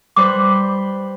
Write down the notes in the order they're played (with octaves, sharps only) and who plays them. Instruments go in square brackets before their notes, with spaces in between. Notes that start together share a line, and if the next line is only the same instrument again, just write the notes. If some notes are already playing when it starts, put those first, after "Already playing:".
[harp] G3 B4 C5 [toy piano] D6